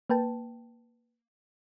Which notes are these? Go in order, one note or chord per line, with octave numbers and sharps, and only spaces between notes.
A#3 B4 G5 A5